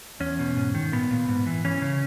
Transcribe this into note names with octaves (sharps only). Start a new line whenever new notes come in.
E2 C#4
B2
G#2
D#3
A#2 B3
A#2
G#2
E3
E3 C#4
C#3